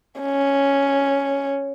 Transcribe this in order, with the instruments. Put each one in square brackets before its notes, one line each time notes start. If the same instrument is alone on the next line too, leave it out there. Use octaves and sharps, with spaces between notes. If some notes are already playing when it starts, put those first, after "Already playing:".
[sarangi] C#4